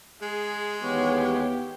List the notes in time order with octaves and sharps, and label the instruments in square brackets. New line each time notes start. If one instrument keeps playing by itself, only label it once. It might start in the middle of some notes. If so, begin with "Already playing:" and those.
[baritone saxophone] G#3 [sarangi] G#4
[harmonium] D#2 C#5 [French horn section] E3 B3 [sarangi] G4